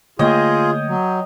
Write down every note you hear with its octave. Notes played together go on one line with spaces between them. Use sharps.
D3 A3 A#3 F4 G#4 C#5 D#5 G5
F#3